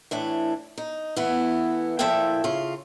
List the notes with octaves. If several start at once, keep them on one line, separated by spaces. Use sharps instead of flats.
A2 E3 D4
D#4
E3 A3 B3 E4
A#2 F3 E4 A4 E5 G5
C#3 F4